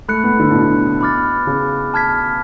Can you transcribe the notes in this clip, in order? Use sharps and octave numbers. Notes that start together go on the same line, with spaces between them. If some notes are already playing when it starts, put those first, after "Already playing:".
A3 B5 F#6 C#7
B3
D3
A2
B2
B5 D6 F6 A6
C#3
A5 F6 G#6 B6